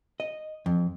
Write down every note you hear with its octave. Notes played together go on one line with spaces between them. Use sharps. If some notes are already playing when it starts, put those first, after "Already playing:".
D#5
F2